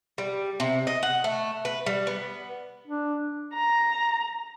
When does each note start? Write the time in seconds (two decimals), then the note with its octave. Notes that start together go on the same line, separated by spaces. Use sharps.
0.18 G3
0.60 C3
0.87 D#5
1.03 F#5
1.24 A3
1.65 B4
1.86 G3
2.07 B3
2.88 D4
3.54 A#5